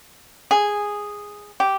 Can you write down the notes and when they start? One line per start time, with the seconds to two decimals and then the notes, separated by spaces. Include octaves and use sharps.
0.51 G#4
1.60 G4